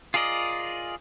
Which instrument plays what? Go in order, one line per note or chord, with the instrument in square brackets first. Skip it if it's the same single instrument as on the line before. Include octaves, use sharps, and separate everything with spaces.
[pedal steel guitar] F4 G#4 A#4 D5 D#5